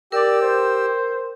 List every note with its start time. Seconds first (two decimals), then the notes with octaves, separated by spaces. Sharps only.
0.12 G4 A#4 D5 E6
0.42 C5